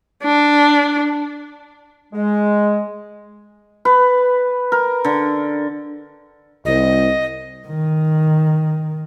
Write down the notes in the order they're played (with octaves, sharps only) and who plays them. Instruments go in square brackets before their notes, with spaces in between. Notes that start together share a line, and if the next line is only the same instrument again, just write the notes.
[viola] D4
[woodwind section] G#3
[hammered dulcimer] B4
A#4
D3
[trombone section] C2 [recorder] D#5
[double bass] D#3